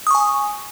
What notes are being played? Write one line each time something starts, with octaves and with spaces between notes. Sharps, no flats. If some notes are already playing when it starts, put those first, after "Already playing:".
G#5 C#6 D#6